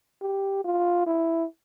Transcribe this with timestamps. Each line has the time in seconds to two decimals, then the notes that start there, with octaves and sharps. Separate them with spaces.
0.22 G4
0.65 F4
1.07 E4